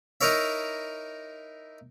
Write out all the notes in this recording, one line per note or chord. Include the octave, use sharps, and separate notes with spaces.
D#4 E4 A#4 C#5 E5